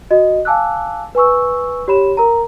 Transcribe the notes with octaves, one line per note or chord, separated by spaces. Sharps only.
F#4 D#5
F5 G#5 A5 D6 E6 F#6
B4 G#5 C#6 E6
G4 C#5 B5 E7
A#4 A#5